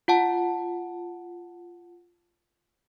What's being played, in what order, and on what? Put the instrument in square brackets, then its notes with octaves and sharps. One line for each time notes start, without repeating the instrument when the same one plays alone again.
[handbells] F4 F#5 A5